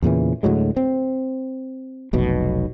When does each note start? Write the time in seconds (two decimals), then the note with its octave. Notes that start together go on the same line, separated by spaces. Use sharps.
0.03 E2 A#2 C#3 E3
0.43 D2 A2 F#3 G#3
0.76 C4
2.13 F1 B1 B2